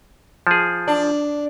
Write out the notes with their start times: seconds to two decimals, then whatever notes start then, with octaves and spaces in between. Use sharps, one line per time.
0.47 F3 G#4
0.88 D4